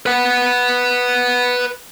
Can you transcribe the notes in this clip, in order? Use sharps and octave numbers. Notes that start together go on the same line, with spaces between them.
B4 F#5